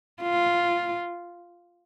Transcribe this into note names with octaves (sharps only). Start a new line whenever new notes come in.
F4